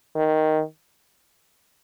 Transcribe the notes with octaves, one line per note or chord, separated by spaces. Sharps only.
D#3